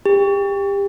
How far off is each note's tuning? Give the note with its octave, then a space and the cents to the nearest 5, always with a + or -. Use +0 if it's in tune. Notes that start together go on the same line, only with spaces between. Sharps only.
G4 +25